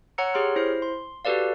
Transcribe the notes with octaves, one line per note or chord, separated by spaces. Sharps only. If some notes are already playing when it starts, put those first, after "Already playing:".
C#5 F#5 A#5 E6 C#7
G4 G#4 C#5 C6 F6
E4 C5 C7
C6
F#4 G4 A4 B4 D5 F5